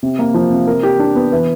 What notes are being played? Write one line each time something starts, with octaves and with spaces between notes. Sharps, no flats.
C3
A#3
F3
C3
A#4
G4
D4
B3
E3